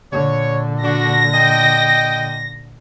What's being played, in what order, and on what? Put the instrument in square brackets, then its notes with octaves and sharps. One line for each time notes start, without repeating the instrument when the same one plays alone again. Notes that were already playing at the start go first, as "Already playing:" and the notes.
[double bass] A#2 D3 [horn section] C#5
[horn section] D4 F#4 [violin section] A#6
[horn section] D#5 G5